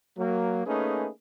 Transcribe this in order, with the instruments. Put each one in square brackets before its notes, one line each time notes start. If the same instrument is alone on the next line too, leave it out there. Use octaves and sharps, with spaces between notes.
[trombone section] F#3 A#3
A3 A#3 C#4 D#4 G#4 B4